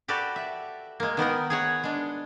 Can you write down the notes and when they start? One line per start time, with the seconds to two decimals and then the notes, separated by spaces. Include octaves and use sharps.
0.08 F#4 G4 A4 B4 D5
0.36 E5
1.00 G#3 A#3
1.17 D#3 B3 D#4 A#4
1.50 G#4 C#5 F#5
1.84 G#3 D4